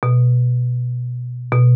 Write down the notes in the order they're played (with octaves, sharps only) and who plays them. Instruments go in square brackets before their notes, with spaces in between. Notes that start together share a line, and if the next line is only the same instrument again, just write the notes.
[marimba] B2
B2